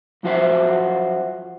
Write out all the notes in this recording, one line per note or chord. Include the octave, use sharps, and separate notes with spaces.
F#2 F3 F#4 C5 E5